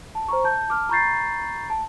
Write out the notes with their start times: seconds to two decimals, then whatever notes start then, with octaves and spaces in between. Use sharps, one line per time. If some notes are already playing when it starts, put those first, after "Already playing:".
0.15 A5
0.28 C5 A#5 C#6
0.44 A5 G6
0.69 A5 D6 F6
0.89 A#5 B5 C#6 G6 A6 C7
1.70 A5